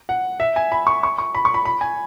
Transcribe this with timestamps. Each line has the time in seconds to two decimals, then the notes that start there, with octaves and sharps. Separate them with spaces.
0.09 F#5
0.40 E5
0.56 G#5
0.72 B5
0.87 C#6
1.03 C#6
1.18 C#6
1.35 B5
1.45 C#6
1.54 B5
1.65 B5
1.81 G#5